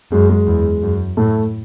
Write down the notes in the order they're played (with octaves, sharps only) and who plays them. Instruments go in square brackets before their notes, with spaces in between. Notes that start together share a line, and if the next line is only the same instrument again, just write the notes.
[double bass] F#2 [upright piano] G#3
[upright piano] G#3
[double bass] E2
F#2
[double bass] A2 [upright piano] A3